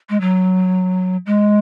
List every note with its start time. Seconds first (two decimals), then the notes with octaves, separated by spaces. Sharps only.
0.09 G#3
0.21 F#3
1.26 G#3